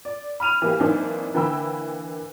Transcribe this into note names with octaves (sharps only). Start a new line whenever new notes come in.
D5
B5 F6 D#7 F7
E3 A#3 G4
E3 F#3 A#3 C4 D4 D#4
D3 E3 A#3 G5 B5 E6